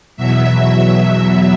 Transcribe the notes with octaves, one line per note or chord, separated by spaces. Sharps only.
E2 B2 F#3 E5